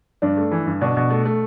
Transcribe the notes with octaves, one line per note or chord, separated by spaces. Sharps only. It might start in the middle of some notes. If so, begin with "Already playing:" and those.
G2 D4
A3
E3
G2
B2 D4
B2
A3
A3